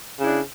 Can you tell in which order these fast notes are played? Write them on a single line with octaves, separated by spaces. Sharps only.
C#3 E4 D4